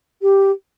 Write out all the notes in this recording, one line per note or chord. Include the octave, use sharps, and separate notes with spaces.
G4